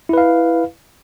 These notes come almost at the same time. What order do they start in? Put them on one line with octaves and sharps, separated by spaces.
E4 B4 F5